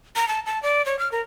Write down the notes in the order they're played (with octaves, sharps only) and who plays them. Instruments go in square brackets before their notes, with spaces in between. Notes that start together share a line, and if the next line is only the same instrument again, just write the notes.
[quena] A#5
A5
A5
D5
C#5
F6
A#4